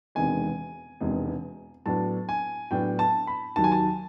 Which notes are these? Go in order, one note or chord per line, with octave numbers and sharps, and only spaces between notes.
E1 E2 C3 D#3 G#3 G#5
E1 E2 C3 D#3 G#3
A2 F#3 B3 D4 A5
G#5
A2 F#3 B3 D4 G5
A5
B5
D#2 D#3 F#3 A5
G#5
A5